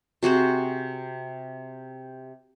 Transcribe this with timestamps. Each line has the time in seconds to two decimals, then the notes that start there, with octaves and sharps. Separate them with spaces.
0.23 C3 F#4 G#4 C5